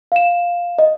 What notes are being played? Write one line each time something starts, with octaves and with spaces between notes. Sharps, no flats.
F5 E7
D#5